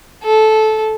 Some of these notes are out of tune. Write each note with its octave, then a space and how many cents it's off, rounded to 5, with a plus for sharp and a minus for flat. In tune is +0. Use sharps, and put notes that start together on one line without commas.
A4 -15